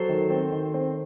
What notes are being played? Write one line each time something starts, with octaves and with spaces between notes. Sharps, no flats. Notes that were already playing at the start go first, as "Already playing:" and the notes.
Already playing: F#3 A4 C5
D#3
C4
D#3
C4